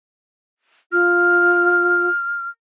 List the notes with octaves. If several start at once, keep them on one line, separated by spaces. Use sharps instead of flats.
F4 F6